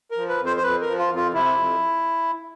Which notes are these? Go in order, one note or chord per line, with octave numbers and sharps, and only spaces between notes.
A#4
F3
B4
F2
C5
C5
F2 B4
A#4
F3
F4
F2
F4
C3 E4
F2